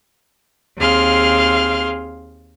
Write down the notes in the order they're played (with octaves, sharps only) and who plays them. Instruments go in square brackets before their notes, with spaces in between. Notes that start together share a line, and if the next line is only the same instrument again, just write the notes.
[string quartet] D#2 C4 G#4 F5 C6 F6